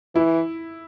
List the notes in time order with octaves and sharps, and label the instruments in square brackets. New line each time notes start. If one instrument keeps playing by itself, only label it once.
[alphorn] E3 [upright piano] E4